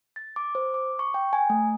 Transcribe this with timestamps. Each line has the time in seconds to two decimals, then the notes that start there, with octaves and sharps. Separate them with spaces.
0.16 A6
0.36 D6
0.55 C5
0.74 D6
0.99 C#6
1.14 G5
1.33 G#5
1.50 A3